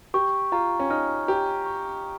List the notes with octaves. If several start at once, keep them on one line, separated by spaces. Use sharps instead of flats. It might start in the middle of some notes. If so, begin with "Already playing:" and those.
G4 C#6
F4 A#5
C#4
D#4 F6
G4 A#5
C#6